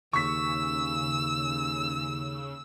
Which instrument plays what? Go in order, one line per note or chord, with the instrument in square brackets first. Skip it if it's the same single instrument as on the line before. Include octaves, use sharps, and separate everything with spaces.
[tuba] D#2 [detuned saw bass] C#3 [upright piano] C#6 B6 [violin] E6